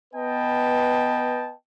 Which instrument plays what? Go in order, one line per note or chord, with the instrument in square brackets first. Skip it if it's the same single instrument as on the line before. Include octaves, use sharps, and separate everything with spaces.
[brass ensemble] B3 B4 D#5 G5 A5